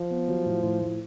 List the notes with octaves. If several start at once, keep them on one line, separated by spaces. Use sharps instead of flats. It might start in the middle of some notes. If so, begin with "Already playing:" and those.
Already playing: F3
B3
F#3
A2
A2
A2